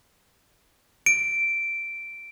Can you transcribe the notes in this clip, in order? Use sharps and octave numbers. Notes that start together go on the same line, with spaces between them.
D7